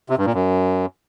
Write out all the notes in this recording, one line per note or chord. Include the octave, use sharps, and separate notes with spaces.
C3
G2
A#2
F#2